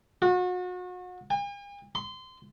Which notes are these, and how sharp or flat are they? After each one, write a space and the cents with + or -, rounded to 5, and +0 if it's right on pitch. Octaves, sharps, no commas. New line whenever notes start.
F#4 -35
G#5 -45
C6 -25